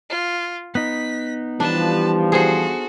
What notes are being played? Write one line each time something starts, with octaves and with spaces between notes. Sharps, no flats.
F4
B3 D#4 B6
E3 F3 G3 D4 B4 A5
F#4 G#4 A4 C5